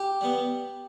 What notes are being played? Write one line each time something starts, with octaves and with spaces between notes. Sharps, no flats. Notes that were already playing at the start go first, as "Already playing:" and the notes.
Already playing: G4
G3 B3